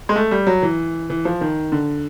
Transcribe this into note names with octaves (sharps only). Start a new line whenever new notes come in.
G#3
A3
G3
F#3
E3
E3
F3
D#3
D3